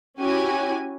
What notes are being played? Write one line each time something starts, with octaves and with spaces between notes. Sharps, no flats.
C#4 E4 F#4 G4 G#5